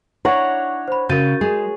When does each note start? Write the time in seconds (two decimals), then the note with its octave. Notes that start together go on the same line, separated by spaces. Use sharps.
0.25 D4 E4 C#5 F#5 A#5
0.88 C5 B5
1.09 C#3 F#4 A#4 G6 A6 D#7
1.41 G#3 G#4